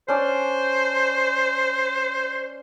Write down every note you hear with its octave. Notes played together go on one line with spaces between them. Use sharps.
C#4 D4 C5 D5